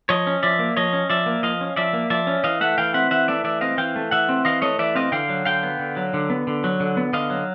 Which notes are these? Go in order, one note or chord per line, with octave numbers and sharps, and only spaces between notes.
F3 C#5 D#5
C#4
F3 D5 E5
A#3
F3 C#5 D#5
C#4
F3 D5 E5
A#3
F3 D#5 F5
C#4
F3 D5 E5
A#3
F3 D5 E5
C#4
E3 D#5 F5
A3 E5 F#5
E3 F5 G5
C4 E5 F#5
E3 E5 F#5
A3 D5 E5
E3 D5 E5
C4 D#5 F5
E3 F5 G5
A3
E3 E5 F#5
C4
E3 D#5 F5
A3 C#5 D#5
E3 D5 E5
C4 D#5 F5
D3 F5 G5
F#3
D3 F5 G5
B3
D3
F#3
D3
B3
D3
F#3
D3
B3
D3 D#5 F5
F#3